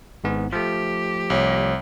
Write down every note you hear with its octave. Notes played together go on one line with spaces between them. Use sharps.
G#1 G#2 B3
F3 A3 G4
C2 C#5